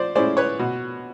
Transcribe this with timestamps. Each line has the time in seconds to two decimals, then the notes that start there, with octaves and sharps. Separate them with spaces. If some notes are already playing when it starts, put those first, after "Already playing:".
Already playing: F3 C5 D5
0.15 G#3 C#4 E4 C5 D5
0.37 B4 C#5
0.59 B2